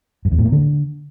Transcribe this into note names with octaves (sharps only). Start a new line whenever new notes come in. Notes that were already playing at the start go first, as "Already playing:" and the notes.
G2
E2
A2
A#3
D3